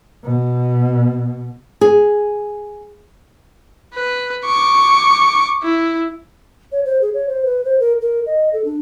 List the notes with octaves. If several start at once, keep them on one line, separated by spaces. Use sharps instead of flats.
B2
G#4
B4
C#6 D6
E4
C#5
C5
G#4
C#5
C5
B4
C5
A#4
A#4
D#5
A4
D4